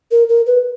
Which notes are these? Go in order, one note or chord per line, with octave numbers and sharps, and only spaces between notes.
A#4
A#4
B4